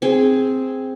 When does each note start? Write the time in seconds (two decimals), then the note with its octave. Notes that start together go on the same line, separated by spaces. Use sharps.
0.02 C4 G#4